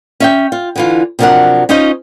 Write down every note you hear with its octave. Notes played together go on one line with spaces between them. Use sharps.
C#4 E5 G5
F4
D3 E3 F4
C3 F3 F#3 D4 A#4 F#5
C#4 D#4 F4 C5 C#5 D#5